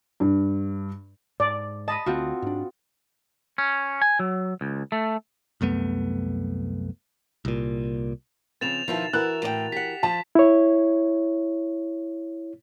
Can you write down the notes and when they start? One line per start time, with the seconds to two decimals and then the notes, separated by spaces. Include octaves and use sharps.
0.20 G2
1.40 G#2 D5
1.88 D#5 A5 B5 D#6
2.06 D2 C4 F4 F#4
2.42 G#2 D4
3.58 C#4
4.02 G#5
4.19 F#3
4.61 C#2
4.92 A3
5.61 C2 F#2 A3 B3
7.45 C2 A#2
8.61 C#3 F3 C4 A6 E7 F7
8.88 B2 D#3 F3 E4 F4
9.13 E3 E4 F#4 A#4 F#6
9.43 A2 D5 G5
9.72 G4 F#5 B6
10.03 F3 A5
10.35 E4 C#5